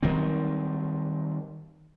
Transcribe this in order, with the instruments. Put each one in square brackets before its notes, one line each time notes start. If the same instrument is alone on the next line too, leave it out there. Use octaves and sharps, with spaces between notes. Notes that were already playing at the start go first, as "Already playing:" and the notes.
[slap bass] D#3 F#3 G3 C4